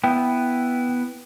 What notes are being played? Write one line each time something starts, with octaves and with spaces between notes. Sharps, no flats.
B3 E4 G5